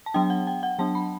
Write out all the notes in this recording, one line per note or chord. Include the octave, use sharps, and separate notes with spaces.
A5
F#3 B3 D4 G5
F#5
G5
F#5
F#3 B3 D4 A5
B5